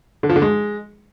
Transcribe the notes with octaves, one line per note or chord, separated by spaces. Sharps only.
D3
F3
D3
G#3